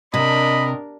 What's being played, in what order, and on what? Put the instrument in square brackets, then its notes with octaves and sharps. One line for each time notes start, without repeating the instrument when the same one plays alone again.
[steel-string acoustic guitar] C3 [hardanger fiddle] D4 A#4 [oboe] D#5 [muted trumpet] B5